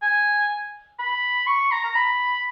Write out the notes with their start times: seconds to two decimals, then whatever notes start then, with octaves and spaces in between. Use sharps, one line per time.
0.02 G#5
0.99 B5
1.47 C#6
1.71 A#5
1.84 A#5
1.95 B5